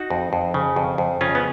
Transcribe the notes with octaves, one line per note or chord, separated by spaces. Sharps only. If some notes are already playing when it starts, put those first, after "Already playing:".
Already playing: D#4 F#4
F2
F2
C#3
F2
F2
C#3 C#4 F4
B3